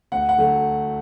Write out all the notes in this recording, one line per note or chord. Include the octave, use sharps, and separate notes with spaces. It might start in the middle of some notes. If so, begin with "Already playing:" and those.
D2 F#5
F#5
D3 F#3 A3